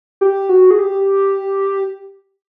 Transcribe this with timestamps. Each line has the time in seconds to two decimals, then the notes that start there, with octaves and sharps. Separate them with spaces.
0.21 G4
0.49 F#4
0.71 G#4
0.79 G4